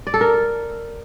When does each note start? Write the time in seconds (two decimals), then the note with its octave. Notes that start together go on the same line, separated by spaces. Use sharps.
0.07 D5
0.14 A4
0.21 A#4